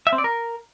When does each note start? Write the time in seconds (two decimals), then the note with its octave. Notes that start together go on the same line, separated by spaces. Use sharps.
0.07 E5
0.13 C4
0.18 D5
0.24 A#4